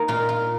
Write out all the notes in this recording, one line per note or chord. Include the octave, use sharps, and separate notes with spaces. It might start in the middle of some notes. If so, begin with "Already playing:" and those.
Already playing: A#3 D#4
A#2 F4
F4